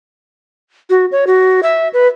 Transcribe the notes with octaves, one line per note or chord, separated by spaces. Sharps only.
F#4
C#5
F#4
E5
B4